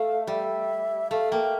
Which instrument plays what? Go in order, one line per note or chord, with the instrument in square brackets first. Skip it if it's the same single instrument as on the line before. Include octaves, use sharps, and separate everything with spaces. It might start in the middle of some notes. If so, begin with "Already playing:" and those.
Already playing: [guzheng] A3 [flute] F5
[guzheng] G3 [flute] E5
[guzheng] A3 [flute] F5
[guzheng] A#3 [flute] G5